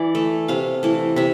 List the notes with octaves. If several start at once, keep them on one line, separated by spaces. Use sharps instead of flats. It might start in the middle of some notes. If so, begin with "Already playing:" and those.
Already playing: E3 D5
A3
C3 F5
E3 A3
C3 E5